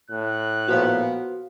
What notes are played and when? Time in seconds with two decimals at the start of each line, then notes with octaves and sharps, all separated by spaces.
0.10 A2 F#6
0.68 A#2 F3 B3 F#4 C5 F5